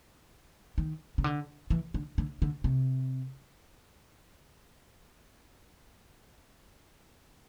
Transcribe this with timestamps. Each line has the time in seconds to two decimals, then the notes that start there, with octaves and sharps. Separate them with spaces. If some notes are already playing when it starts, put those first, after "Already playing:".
0.78 D#3
1.18 C#3
1.24 D3
1.70 E3
1.94 D3
2.18 D3
2.42 D3
2.64 C3